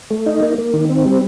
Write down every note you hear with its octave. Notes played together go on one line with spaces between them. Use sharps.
A3
D#4
A#3
A#3
D#3
C4
G3